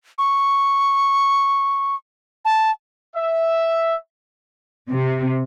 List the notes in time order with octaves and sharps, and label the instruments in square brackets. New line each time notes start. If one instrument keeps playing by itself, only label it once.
[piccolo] C#6
A5
[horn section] E5
[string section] C3